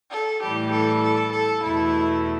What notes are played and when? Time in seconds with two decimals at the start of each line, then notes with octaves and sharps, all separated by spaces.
0.11 A4
0.42 A2 E3 G3 G4
0.72 A4
1.03 A4
1.32 A4
1.63 E2 B2 A3 E4